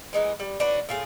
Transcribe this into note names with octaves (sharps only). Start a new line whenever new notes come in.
E3 G#3 D#4
G3
D4 F#4 B4 C#5
A2 F4 G#4